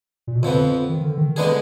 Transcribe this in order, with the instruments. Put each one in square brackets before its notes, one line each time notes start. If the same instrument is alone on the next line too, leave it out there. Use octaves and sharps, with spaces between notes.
[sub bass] A#2
B2
[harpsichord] F2 F3 B3 [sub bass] D3
[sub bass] D#3
D3
D#3
[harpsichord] D3 G#3 B3 D4 G#4